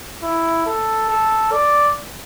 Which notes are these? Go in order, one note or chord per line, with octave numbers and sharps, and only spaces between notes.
E4
A4
A4
D5